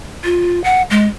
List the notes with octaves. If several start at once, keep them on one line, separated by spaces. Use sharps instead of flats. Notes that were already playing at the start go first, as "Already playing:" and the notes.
F4
F#5
G#3